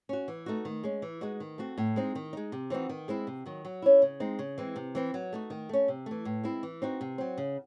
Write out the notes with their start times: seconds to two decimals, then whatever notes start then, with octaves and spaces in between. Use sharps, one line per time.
0.09 C#4 F#4
0.28 E3
0.46 A3 D#4 F#4
0.65 D#3
0.84 G#3 C#4
1.02 E3
1.21 G#3 D#4 F#4
1.40 D#3
1.58 A3 C4 F#4
1.78 A2
1.96 G#3 C4 D#4
2.15 D#3
2.33 G#3 D#4
2.52 C3
2.70 E3 C4 D#4 F#4
2.89 D#3
3.08 G#3 C4 E4
3.27 C3
3.46 D#3 F#3
3.65 F#3
3.82 C#4 E4
4.02 C#3
4.20 G#3 C4 D#4
4.39 C#3
4.58 E3 G#3 C4
4.76 C3
4.95 E3 C4 E4
5.14 F#3
5.33 A3 D#4 F#4
5.50 D#3
5.69 A3 C#4
5.88 C3
6.06 E3 A3
6.25 A2
6.44 G#3 C4 E4
6.63 E3
6.82 C4 D#4 F#4
7.01 C3
7.18 F#3 C4
7.38 C#3